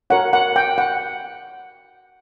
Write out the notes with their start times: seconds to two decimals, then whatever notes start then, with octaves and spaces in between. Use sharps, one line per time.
0.10 F#4 A#4 C#5 F#5
0.33 F#5
0.56 G5
0.78 F#5